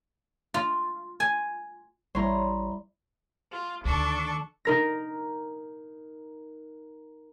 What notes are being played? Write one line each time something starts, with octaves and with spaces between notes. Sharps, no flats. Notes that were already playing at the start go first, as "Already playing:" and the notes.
F4
G#5
A1 G3 E4 C#5 A#5 C6
F4
D2 D#3 D4 A4 C#6
D#4 A#4 A#6